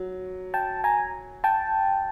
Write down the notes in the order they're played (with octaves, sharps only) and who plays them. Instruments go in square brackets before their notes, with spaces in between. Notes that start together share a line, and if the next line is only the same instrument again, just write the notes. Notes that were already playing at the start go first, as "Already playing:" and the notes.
Already playing: [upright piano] F#3
[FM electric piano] G5 A5
G#5 A#5
G5 A5